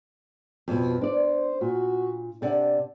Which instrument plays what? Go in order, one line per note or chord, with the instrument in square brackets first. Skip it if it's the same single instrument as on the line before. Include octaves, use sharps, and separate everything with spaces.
[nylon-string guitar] F2 B2
[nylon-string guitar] D4 D5 [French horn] C5
[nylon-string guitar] A#2 [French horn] F#4
[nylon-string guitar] C3 D5 F#5 [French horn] D4